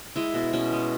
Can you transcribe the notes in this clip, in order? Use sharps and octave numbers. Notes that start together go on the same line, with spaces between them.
G#3 E4
B2
B2 C#4
G#3